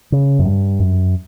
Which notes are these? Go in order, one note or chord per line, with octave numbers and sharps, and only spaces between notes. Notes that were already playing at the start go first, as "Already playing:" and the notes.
C#3
F#2
G2
F#2